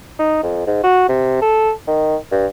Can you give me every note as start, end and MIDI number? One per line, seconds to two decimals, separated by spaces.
0.19 0.39 63
0.43 0.65 41
0.67 0.82 44
0.83 1.05 66
1.09 1.37 48
1.42 1.71 69
1.88 2.16 51
2.32 2.46 43